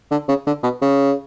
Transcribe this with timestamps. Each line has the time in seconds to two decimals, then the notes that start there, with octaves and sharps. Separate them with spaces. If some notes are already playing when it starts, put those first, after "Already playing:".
0.11 D3
0.28 C#3
0.46 D3
0.63 B2
0.81 C#3